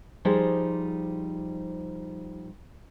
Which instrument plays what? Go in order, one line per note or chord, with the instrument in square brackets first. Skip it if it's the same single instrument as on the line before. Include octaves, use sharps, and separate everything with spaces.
[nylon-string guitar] F3 G3 D#4 G4 G#4 C5